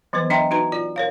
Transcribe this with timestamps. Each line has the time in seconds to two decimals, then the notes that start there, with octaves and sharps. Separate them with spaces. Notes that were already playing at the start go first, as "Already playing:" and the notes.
0.13 E3 F#3 B3 B4 C5
0.30 D4 D#5 E5 G5 A#5 C6
0.51 D#4 F#4 B4 A#5
0.72 F4 D5
0.96 A#4 C#5 F5